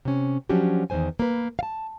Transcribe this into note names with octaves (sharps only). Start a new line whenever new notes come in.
C3 C#4
F3 F#3 C#4 D4 F#4 G4
E2 D#3 E3 C5 G#5
A#3 B4
F5 A5